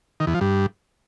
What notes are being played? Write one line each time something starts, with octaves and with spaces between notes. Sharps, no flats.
D#3
E2
F3
G2